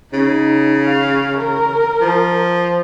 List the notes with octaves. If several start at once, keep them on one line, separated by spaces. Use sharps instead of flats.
C#3 D#4
F5
A#4
F3